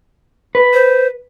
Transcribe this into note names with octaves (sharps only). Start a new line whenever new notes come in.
B4
C5